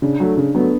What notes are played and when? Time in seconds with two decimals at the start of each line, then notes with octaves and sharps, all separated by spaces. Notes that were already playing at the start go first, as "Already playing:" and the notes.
0.02 C#3 D4
0.20 F#3 A3
0.37 C#3 D4
0.55 F#3 A3 B3